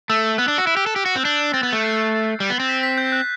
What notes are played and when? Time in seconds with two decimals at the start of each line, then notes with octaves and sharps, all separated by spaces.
0.10 A3 E6
0.38 B3 F#6
0.48 D4
0.58 F#4
0.67 E4
0.77 G4
0.86 A4
0.96 G4
1.06 F#4
1.15 C4
1.24 D4 G6
1.53 C4 A6
1.63 B3
1.73 A3
1.83 C7
2.40 G3
2.50 B3
2.60 C4
2.69 B6
2.83 B6
2.98 G6
3.12 F#6